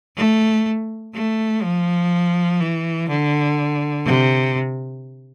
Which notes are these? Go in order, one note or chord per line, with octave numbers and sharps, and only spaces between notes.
A3
A3
F3
E3
D3
C3